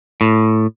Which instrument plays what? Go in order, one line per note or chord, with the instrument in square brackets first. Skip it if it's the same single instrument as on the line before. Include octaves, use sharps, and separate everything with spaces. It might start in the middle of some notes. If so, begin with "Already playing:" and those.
[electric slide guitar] A2